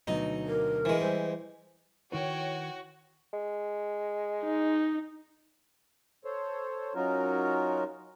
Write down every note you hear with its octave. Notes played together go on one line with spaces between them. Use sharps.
D2 B2 F#3 D#4
A#4
E3 G#3
G3 C5
D#3 E4 F#4 B4 C#5 G5
G#3
D#4
A4 C5 C#5
F#3 C#4 D#4 F4 F#4 A#4